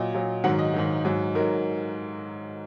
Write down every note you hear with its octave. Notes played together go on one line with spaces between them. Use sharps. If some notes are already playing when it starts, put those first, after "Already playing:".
Already playing: A#2 F#3 D#5
A#2 F#3
G#2 D#3 F#3 F#5
D#5
G#2 D#3 F#3
G#2 F#3
G#2 F#3 A#4